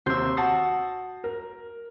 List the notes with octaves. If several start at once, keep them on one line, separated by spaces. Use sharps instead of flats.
D#2 C3 E5 C6 G6
F#4 A5 D#6 C7
A#4